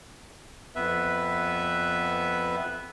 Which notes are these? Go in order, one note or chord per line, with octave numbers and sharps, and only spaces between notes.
F2 B3 B4 E5